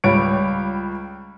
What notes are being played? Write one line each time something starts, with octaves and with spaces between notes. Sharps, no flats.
C#2 G3 C#5 D7